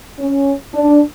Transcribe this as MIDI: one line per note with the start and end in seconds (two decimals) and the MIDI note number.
0.19 0.53 61
0.74 1.01 62